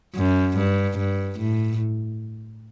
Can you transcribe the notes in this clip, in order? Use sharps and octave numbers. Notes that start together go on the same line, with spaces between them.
F#2
G2
G2
A2